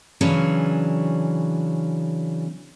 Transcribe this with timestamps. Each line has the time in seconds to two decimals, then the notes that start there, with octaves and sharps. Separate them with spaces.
0.21 C#3 E3 F#3 C#4 D4